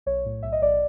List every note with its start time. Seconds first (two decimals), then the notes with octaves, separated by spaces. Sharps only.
0.06 B1 C#5
0.25 A2
0.43 B1 E5
0.52 D#5
0.62 B1 D5